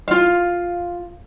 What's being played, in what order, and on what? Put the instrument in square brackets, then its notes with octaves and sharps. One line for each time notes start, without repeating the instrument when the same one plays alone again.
[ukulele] F4 F5